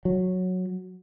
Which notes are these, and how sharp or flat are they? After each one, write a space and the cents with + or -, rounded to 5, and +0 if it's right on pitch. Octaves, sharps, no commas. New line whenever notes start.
F#3 -10